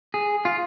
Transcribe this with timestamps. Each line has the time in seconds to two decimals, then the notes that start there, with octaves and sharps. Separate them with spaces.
0.14 G#4
0.45 F4